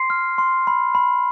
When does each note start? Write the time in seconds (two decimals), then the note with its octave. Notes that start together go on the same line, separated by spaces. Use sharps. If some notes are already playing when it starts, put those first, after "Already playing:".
Already playing: C6 C7
0.10 F6
0.38 C6
0.67 B5
0.95 B5